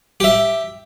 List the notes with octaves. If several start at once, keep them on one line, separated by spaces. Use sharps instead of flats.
G4 E5